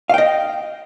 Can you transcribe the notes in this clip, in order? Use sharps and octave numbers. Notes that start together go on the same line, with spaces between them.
D#5 F5 G5